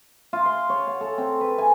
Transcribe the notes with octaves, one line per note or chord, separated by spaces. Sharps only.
F4
C6
C#5
F#5
A4
C4
B4
G#5